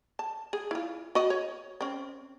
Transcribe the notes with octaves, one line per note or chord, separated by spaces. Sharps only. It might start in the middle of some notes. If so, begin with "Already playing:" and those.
A5
G#4
E4 F4
F#4 D5 D#5
C#5
C4 C#4